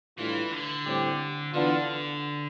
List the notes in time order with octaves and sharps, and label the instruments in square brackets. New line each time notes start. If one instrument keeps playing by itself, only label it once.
[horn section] A2 G3 D4 F4 [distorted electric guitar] E3
[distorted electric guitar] D3
[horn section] A2 G3 C4 G4
[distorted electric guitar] D3 [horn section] E3 B3 D4 F4